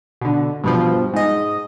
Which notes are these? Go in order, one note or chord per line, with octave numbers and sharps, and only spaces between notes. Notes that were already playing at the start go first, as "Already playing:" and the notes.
B2 D3
G2 B2 F3
G#2 D#5